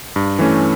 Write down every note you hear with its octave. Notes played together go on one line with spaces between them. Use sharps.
G2
E3 A3 C#4